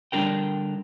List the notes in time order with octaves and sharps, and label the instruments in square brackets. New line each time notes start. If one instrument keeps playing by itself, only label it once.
[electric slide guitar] D3 G3 D4 F4 A#4 G5